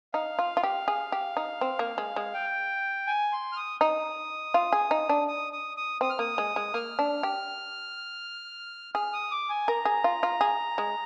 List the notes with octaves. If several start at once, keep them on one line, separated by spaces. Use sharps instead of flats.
D#4 F5
F4
F4
G4
G#4
G4
D#4
C4
A#3
G#3
G#3
G5
G#5
C6
F6
D#6
D#4 D#6
F4
G#4
D#4
D4
D#6
D#6
D#6
C4 D#6
F6
A#3 D#6
G#3
G#3
A#3 F6
D4
G4
G#4 F6
D#6
D6
G#5
A#4 A#5
G#4
F4
F4
G#4
G#3